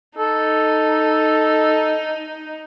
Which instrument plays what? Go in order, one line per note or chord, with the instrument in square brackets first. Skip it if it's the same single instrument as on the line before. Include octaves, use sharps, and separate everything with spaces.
[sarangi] D#4 [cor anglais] A4